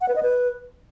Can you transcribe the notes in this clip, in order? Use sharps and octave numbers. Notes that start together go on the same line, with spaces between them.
F#5
B4
D#5
B4